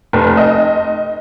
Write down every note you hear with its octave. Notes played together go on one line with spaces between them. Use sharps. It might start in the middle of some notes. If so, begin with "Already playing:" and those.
F1
D#5